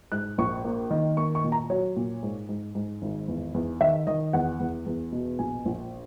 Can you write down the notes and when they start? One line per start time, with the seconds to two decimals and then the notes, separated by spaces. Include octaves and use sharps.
0.12 G#2 F#6
0.38 A#1 C#6
0.64 A#3
0.91 D#3
1.17 A#3 C#6
1.35 C#6
1.44 A#2
1.52 A#5
1.70 F#3 C#5
1.96 A#2
2.23 G#2
2.49 G#2
2.75 G#2
3.02 G#1
3.28 E2
3.54 E2
3.81 D#3 E5
4.07 D#3 D#5
4.33 E2 F#5
4.60 E2
4.86 E2
5.12 B2
5.39 A#1 G#5
5.65 A#1